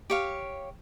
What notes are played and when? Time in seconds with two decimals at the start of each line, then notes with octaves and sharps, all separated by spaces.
0.10 G4 C#5 F5